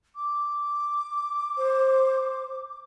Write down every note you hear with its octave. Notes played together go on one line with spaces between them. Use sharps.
D6
C5